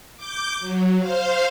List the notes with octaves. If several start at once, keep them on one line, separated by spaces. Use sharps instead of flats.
D6 G6
F#3
C5 F5